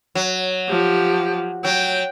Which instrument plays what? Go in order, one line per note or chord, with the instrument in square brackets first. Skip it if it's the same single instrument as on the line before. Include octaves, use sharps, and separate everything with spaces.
[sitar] F#3
[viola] F3 G4
[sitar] F#3 [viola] G5